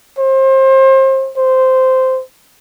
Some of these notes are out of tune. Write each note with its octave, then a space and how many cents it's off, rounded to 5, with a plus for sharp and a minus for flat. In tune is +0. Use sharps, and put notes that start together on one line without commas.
C5 +30
C5 -10